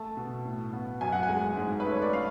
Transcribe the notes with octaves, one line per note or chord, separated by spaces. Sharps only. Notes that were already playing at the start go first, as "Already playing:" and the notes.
Already playing: A3 A5
B2
A2
B3
F#2 G#5
F#5
G#5
G#3
G#2
B4
A3
C#5
D5
A3 F5